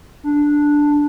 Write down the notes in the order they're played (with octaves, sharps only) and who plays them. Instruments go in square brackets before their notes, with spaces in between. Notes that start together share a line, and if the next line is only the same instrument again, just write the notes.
[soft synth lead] D4